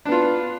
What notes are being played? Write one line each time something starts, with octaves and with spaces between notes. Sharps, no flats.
B3 D4 F4